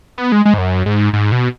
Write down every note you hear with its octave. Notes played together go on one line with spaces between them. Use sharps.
B3
G#3
G#3
G#2
F#2
G#2
G#2
B2